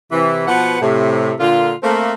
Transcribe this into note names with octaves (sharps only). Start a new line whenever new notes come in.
C3 E3
B2 F3 B4 F#5
A2 C3
A#2 D3 F4
A3 A#3 C4